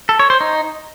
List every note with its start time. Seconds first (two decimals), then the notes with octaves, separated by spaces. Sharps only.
0.09 A4
0.19 C#5
0.30 C5
0.41 D#4